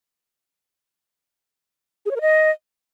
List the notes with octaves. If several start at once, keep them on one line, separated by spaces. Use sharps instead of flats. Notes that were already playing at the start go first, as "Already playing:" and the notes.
G#4
C#5
A#4
D#5